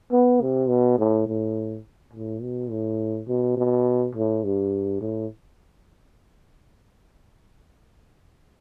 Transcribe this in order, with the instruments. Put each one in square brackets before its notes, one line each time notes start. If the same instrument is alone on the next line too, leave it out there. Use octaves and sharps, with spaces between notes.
[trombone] B3
C3
B2
A2
A2
A2
B2
A2
B2
B2
A2
G2
A2